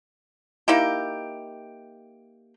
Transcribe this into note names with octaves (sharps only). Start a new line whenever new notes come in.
A#3 D#4 E4 G4